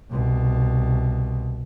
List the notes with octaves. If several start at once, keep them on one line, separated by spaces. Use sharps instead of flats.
C2 B2